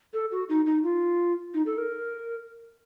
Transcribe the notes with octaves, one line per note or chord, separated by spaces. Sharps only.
A4
F#4
D#4
D#4
F4
D#4
A4
A#4